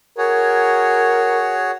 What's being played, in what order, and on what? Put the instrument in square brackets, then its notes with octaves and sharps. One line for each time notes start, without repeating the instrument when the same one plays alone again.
[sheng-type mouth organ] F#4 G#4 C#5 [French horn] A#4